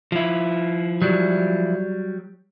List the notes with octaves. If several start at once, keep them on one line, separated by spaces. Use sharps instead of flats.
F3 E4
F#3 G3